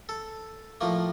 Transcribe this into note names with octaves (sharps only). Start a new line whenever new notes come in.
A4
A2 F3 A#3